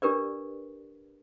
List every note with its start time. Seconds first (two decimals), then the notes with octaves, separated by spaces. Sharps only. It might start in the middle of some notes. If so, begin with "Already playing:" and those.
0.02 D4 G4 A#4 B4 D5